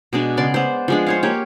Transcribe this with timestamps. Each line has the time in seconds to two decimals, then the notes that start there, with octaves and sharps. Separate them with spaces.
0.13 B2 G#3 D4
0.37 C#3 B3 D5 C6
0.54 B3 C5
0.88 F3 G#3 D4
1.07 C5 C#5 F5
1.23 A#3 G4 C#5